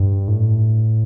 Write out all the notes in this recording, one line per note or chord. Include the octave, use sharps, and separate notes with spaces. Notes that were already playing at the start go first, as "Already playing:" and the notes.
Already playing: G2
A2